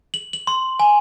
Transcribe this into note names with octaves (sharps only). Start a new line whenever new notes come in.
F#7
F#7
C6
G#5